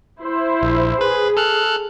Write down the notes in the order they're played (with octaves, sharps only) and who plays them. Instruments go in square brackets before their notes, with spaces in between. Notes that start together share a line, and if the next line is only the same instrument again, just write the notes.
[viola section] E4 C5
[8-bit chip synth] A#1
[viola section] G#4 [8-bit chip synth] B4
[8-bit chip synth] A4 F6 F#6